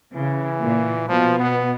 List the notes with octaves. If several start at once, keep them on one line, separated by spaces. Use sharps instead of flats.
C#3 E3
A#2
B2 F3
B3